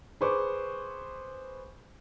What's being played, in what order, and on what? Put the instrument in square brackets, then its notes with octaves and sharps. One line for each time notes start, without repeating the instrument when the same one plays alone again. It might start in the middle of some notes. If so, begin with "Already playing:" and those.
[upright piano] G#4 B4 C5 C#6 D6